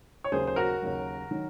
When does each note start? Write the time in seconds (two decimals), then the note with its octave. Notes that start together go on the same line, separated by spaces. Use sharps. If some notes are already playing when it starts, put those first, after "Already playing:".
0.24 C#5
0.32 D#2 C#3 F#3 G#4 C5
0.47 C5
0.56 F#4 A#4
0.82 D#2 C#3 F#3
1.31 D#3 F#3